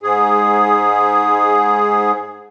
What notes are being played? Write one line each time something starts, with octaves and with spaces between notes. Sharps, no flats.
G#2 G#4